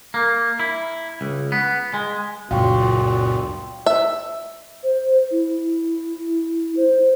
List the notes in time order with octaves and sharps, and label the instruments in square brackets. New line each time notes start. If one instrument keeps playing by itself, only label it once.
[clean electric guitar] A#3
E4
C#2
B3
G#3
[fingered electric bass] C#2 F#2 F#3 [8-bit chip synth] A#2 [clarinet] F#4 [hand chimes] F5 G5 C6
[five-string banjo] E5
[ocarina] C5
E4
C5